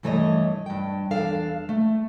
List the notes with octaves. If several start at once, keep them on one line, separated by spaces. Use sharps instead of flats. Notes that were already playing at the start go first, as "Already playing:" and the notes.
G2 E3 A3 A#4 C#5 D#5
G2 G5
E2 D4 A4 F5
A3